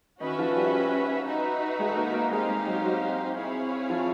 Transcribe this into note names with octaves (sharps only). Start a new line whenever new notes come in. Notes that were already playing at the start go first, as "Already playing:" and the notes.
D#3 C#4 D#4 F#4 B4 E5
F3 F4
G3 G4
D#4 F#4 B4 E5
G#3 G#4
A4
A#3 A#4
A#3 A#4
G#3 C4 D#4 G4 G#4 C5 F5
G#3 G#4
F#3 F#4
F#3 F#4
C4 E4 G#4 C#5 F5
F3 F4